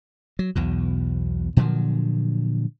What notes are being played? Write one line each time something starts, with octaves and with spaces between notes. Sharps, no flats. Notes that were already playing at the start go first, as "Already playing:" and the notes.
F#3
B1 E2 B2
A#2 D3 F3 F#3